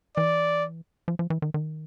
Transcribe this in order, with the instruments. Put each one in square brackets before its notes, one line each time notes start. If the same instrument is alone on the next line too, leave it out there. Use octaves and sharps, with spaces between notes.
[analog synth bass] E3 [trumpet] D5
[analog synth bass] F3
F3
E3
D#3
D#3